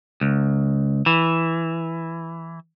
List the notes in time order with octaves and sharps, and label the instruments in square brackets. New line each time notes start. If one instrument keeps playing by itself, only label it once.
[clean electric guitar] C#2
E3